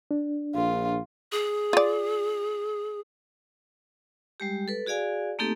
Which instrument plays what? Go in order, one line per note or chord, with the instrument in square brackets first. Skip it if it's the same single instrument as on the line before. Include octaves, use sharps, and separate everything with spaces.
[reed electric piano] D4
[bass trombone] A#1 [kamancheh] F4
[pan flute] G#4
[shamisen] F4 D5
[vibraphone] G3 G#3 G4
A4 B4
F#4 G#4 D5 F5 G#5
A3 A#3 C4 D#4 G4 A4